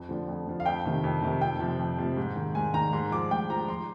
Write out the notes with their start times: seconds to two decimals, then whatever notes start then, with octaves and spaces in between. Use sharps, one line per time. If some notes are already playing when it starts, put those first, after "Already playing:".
Already playing: F2
0.09 D3 F3
0.28 F2
0.46 D3 F3
0.60 F5
0.65 F2 G5
0.85 C3 D#3
1.04 F2
1.22 C3 D#3
1.41 F2 G5
1.60 C3 F3
1.79 F2
1.98 C3 F3
2.17 G#2
2.36 D#3
2.55 G#2 G#5
2.74 D#3 A#5
2.93 G#2 C6
3.12 F3 D6
3.31 G#2 G5
3.50 F3 A#5
3.69 C6